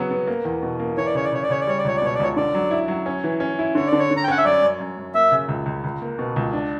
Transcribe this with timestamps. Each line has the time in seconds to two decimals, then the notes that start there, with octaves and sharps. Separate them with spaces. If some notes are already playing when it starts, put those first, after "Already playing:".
Already playing: C#3 F#3 B3
0.11 B3
0.27 A#3
0.45 E2
0.62 B2
0.80 A#3
0.98 E3 C#5
1.06 D5
1.15 C#3 C#5
1.24 D5
1.32 C#3 C#5
1.43 D5
1.50 C#3 C#5
1.61 D5
1.67 G3 C#5
1.78 D5
1.85 C#2 C#5
1.97 D5
2.02 B2 C#5
2.15 D5
2.20 C#2 C#5
2.36 D3 D5
2.54 F#3
2.71 E4
2.88 F#3
3.06 C#4
3.24 E3
3.40 C#4
3.59 E4
3.75 D3 C#5
3.87 D5
3.92 D3
3.99 C#5
4.11 D3
4.17 A#5
4.24 G5
4.28 C#4 F#5
4.37 E5
4.45 F#2 D5
4.62 F#2
4.80 F#2
4.98 F#2
5.14 A#3 E5
5.32 C#3
5.49 C#2
5.66 C#2
5.84 C#2
6.02 A#3
6.19 B2
6.36 C#2
6.53 D4